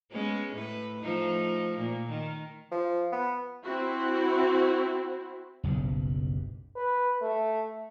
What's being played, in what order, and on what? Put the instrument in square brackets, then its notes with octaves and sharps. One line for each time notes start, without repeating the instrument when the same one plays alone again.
[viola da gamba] G#3 B3 C#4
A2 A3 B4
F3 A3 D#4
A#2
D#3
[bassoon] F3
B3
[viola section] C4 E4 F#4
[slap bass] F#1 B1 G2
[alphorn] B4
A3